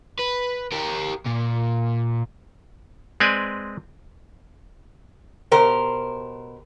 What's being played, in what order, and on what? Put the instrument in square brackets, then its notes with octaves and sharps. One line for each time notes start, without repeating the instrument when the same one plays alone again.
[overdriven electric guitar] B4
G4 A#4
A#2
[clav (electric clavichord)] G#3 C4 B4 D5 G#5
[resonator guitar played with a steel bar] B2 G4 A#4 C5